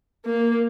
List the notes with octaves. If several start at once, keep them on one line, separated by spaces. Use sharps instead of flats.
A#3